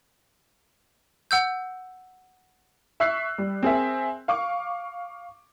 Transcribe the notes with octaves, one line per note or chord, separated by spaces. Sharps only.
F#5 E6 G6
E5 C#6 E6 F#6 C7
G3
C4 G#4 A#4 E5
F5 C#6 D6